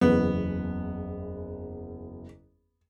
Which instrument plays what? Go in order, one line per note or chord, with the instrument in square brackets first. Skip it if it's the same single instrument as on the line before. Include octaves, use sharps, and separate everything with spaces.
[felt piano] F#1 E2 [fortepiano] B3